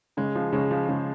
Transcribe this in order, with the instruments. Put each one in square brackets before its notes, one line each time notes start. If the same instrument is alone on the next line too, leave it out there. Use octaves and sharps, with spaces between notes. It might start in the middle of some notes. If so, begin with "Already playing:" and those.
[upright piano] C#3 [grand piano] G#3
[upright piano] F3
[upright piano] C#3 [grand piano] G#3
[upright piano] F3
[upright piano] C#3 [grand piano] G#3